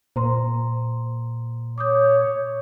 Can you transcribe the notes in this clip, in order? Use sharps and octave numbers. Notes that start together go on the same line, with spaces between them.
A#2 C5 A#5 C6
C#5 D6 D#6 G6